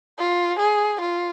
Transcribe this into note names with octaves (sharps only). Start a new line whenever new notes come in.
F4
G#4
F4